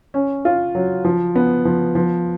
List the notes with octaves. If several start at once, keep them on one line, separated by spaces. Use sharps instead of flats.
C#4
F4
F#3
F3
B3
F3
F3